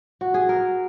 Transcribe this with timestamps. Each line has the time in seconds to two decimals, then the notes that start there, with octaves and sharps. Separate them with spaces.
0.21 F#4
0.34 G#4
0.49 A#4